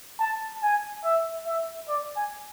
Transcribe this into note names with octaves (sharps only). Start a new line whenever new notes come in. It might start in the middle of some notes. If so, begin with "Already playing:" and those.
A5
G#5
E5
E5
D5
G#5